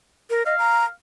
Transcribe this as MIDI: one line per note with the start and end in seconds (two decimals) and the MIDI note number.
0.30 0.43 70
0.46 0.58 75
0.46 0.90 77
0.59 0.84 82